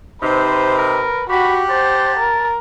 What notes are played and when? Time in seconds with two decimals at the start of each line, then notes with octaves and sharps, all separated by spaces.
0.23 C3 D#4 B4 C5
0.78 A#4
1.30 F#4 G4 F#5 B5
1.70 C5 A5
2.19 A#4